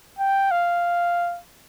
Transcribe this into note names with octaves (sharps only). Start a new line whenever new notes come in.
G5
F5